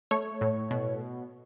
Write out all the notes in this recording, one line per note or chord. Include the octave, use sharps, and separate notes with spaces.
A3 C#5
A2
B2